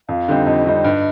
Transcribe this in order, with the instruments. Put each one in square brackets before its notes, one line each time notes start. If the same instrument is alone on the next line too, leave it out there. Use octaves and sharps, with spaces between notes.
[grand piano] F2 [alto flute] F5
[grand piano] D3 G3 C4 D#4
[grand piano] F2 [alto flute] D#5
[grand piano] D3 G3 C4 D#4
G2